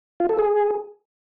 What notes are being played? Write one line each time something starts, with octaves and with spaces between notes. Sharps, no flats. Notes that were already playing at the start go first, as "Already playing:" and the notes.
F4
A4
G#4